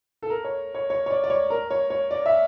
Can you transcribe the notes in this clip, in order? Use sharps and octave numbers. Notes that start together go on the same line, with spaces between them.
A4
A#4
C#5
C#5
C#5
C#5
D5
D5
C#5
A#4
C#5
C#5
D5
E5